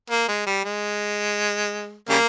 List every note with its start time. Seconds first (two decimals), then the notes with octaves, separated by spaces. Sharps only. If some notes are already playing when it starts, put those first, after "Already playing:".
0.10 A#3
0.28 G#3
0.46 G3
0.64 G#3
2.10 C#3 G3 A#3